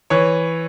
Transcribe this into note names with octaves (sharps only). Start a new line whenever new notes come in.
E3 C#5